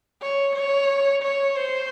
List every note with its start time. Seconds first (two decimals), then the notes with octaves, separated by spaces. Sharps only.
0.22 C#5
0.56 C#5
1.23 C#5
1.56 C5